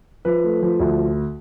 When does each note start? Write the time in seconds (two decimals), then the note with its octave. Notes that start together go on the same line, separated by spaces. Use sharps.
0.25 F3 B4
0.44 A3
0.62 F3
0.80 D2